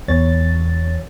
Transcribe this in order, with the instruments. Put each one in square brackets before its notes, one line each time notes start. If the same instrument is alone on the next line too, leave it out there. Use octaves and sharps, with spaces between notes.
[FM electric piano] E2 C#5 A6